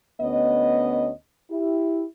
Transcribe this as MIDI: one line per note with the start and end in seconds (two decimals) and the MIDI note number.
0.21 1.10 38
0.21 1.10 59
0.21 1.10 61
0.21 1.10 75
1.50 2.05 64
1.50 2.05 67